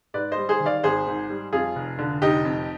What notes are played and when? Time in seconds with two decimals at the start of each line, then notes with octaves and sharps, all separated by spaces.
0.14 G#2 B4 D5
0.32 C5 D#5
0.37 G3
0.49 G#4 C5
0.60 D#3
0.66 D5 F5
0.84 G#1 G#4 C5
1.07 G#2
1.30 G3
1.53 F2 F4 G#4
1.76 F1
1.99 D3
2.22 F1 D#4 G4
2.45 F2